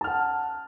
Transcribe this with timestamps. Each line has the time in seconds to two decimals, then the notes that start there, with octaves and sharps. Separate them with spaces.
0.01 A5
0.04 F6
0.08 F#5